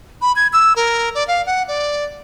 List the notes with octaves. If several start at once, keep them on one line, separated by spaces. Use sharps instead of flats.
B5
G#6
E6
A#4
D5
F5
F#5
D5